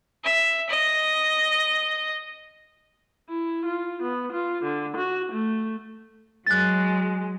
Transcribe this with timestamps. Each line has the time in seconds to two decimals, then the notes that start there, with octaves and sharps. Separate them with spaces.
0.24 E5
0.69 D#5
3.29 E4
3.65 F4
4.03 B3
4.32 F4
4.64 D3
4.97 F#4
5.32 A3
6.47 F#3 G#3 F#6 A6